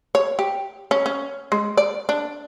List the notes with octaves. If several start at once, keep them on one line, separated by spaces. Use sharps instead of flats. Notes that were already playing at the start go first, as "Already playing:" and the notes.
C#5
G4
C#4
C#4
G#3
D5
D4